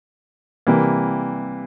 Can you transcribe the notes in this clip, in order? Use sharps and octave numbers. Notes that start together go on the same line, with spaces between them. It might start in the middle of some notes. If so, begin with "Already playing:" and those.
C3 E3 G3 A#3